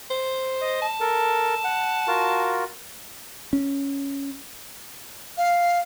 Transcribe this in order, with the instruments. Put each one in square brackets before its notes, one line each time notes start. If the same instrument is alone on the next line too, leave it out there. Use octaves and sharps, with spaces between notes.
[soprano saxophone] C5
[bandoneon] D#5
[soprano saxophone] A5
[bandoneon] A4 A#4
F#5
F4 F#4 A#4
[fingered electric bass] C#4
[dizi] F5